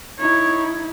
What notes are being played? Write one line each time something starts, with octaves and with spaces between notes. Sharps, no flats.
D#4 E4 C#5